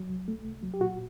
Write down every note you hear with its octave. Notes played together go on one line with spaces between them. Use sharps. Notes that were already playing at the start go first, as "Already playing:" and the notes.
Already playing: F#3
C2
A3
C2
F#3
G4
A#2 F#4